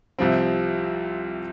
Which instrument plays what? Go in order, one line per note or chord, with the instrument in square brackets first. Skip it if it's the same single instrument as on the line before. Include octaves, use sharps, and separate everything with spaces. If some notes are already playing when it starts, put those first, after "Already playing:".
[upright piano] C2 C3 F3 C4